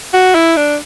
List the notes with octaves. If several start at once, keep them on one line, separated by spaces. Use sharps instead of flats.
F#4
E4
D4